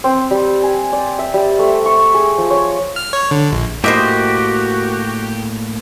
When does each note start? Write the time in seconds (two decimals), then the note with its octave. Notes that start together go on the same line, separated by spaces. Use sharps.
0.04 C4
0.31 G3
0.63 G#5
0.93 D5
1.19 E5
1.34 G3
1.59 A3
1.86 C#6
2.14 G#4
2.38 F3
2.51 C#5
2.96 F6
3.13 C#5
3.31 D3
3.52 A#1
3.84 A2 A#3 F#4 G4 C5 D#5 E5